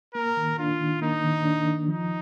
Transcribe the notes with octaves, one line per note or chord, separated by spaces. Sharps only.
A#3 A#4
D#3
D4 F4
D#3
A#3 D#4
D#3
D4
D#3
F3 D#4